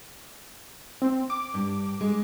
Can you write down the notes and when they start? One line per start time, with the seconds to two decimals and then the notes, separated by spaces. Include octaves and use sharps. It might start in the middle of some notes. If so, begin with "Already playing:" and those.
1.02 C4
1.30 D6
1.54 G2
2.01 G#3